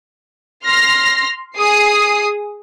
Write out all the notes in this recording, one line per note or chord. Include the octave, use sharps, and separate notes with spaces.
C6 F6 A#6
G#4 D#6 C7